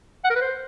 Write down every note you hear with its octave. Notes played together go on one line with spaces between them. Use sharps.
F#5
A#4
B4
C5